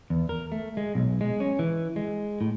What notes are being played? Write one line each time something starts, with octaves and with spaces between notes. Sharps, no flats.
E2
A#4
A3
G#3
B1
G#3
C#4
E3
G#3
A2